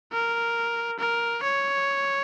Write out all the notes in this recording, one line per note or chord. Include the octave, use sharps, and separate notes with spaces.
A#4
A#4
C#5